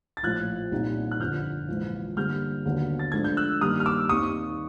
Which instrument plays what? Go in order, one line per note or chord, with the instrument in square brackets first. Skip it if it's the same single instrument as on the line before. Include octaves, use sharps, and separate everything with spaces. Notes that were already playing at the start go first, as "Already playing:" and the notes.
[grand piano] A6
[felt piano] A#1 A2 F3 [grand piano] F#6 G#6
[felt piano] C2 A#2 G3 C4 D#4
[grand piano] F#6
[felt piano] G1 F2 D3 [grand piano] F6 G6
[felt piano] A#1 G#2 E3
[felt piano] G2 D3 G3 A#3 [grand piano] F6 G6
[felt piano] D#2 D3 F#3 B3
[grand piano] A6
[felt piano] G#2 F3 A3 D4 [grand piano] G#6
[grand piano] G6
E6 F#6
[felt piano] G2 D#3 G3 A#3 [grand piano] D#6 F6
[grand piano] F6
D6 E6
[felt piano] D#2 D#3 G3 C4 [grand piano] C#6 D#6